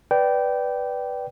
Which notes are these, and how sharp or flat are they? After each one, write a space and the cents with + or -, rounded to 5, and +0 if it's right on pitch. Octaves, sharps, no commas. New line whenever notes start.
B4 +0 D5 +0 G5 -15